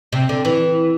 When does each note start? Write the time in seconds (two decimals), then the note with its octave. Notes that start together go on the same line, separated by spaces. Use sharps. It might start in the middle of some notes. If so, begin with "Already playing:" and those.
0.13 C3
0.29 D3
0.45 E3